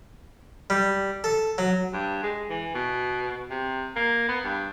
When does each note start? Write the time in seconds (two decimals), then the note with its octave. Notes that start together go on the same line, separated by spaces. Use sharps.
0.70 G3
1.24 A4
1.58 F#3
1.93 G2
2.23 G#3
2.50 E3
2.75 B2
3.50 C3
3.96 A#3
4.28 B3
4.44 G2